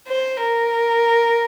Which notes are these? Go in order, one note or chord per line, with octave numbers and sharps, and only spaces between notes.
C5
A#4